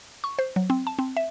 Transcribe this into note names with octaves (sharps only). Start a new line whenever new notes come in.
C#6
C5
F#3
C4
A5
C4
E5